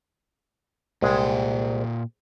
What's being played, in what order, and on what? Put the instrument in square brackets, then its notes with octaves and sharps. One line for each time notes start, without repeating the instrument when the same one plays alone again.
[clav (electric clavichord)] C2 G#3 G#4 [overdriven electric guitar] A#2 G5